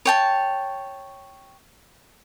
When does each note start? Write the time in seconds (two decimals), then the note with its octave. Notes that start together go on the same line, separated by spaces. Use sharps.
0.05 C#5 G5 A5